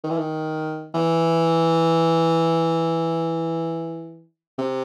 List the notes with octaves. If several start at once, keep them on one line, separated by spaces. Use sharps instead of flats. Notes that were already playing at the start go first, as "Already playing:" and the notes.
D#3
E3
D#3
E3
C3